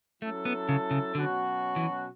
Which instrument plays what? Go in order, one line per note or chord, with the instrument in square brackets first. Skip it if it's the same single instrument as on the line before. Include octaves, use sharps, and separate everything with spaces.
[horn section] F#3 C#4 E4 A4 [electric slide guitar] A3
[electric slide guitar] B3
C#3
C#3
[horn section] B2 F#3 C#4 F#4 [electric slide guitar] D3
[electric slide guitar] E3